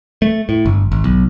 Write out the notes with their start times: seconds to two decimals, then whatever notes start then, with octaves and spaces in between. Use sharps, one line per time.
0.22 A3
0.49 A2
0.66 G1
0.92 G#1
1.04 B1